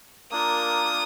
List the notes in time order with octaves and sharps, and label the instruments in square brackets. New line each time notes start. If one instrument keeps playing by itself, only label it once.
[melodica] A#3 D4 F4 A#4 [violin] D#6